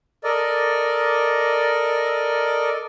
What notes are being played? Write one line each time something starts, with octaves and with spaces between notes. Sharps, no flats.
A4 A#4 D5 D#5